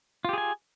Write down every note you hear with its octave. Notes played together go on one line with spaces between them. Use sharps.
F4 G4 G#4 G#5